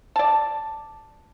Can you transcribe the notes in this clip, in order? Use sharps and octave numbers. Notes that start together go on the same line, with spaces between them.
D5 A5